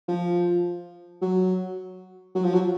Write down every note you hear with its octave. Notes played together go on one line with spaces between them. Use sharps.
F3
F#3
F#3
F3
F#3